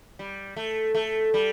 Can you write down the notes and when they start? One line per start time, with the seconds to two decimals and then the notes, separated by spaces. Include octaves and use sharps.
0.19 G3
0.56 A3
0.95 A3
1.34 G3